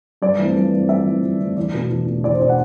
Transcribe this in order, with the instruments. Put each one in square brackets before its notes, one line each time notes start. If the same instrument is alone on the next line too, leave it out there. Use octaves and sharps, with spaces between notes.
[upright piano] G2 D5
E3 A3 C4
G2
E3 A3 C4
G2 E5
E3 A3 C4
G2
E3 A3 C4
E2 D5
B2 A3 D4
E2
B2 A3 D4
E2 D5
C5
B2 A3 D4 D5
F#5